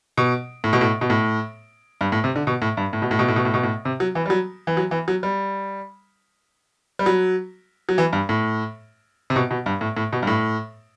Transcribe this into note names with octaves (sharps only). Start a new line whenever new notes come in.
B2
A2
B2
A2
B2
A2
G2
A2
C3
D3
B2
A2
G2
A2
B2
A2
B2
A2
B2
A2
B2
A2
C3
F#3
E3
G3
F#3
E3
F#3
E3
F#3
G3
G3
F#3
F#3
E3
G2
A2
C3
B2
B2
G2
A2
A2
B2
G2
A2